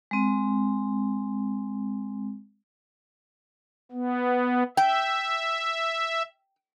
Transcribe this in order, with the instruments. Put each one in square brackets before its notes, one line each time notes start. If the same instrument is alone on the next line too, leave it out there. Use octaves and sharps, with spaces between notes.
[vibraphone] G#3 C4
[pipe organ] B3
[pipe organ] E5 [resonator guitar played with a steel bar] G5